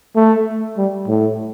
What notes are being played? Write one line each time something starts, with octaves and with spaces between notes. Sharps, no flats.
A3
G3
A2